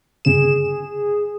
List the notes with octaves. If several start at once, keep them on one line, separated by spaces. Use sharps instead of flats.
G1 C#3 G#4 E7